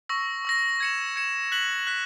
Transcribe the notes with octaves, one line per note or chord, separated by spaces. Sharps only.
C#6 E6 A#6
C#6 E6 A#6
G#6 C#7 E7
G#6 C#7 E7
F#6 B6 F#7
F#6 B6 F#7